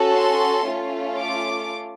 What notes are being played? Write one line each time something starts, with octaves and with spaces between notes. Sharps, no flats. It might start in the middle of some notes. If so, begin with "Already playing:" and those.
Already playing: C#4 F#4 A4
C6
A3 C#4 F4
D6